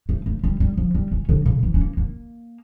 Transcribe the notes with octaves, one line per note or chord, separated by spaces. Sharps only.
A3
A3
G3
G3
F3
G3
C#4
D3
C#3
E3
C#4
A#3
A#3